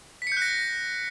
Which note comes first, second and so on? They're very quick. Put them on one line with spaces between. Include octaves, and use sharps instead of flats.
B6 C#7 G6 F#6 A#6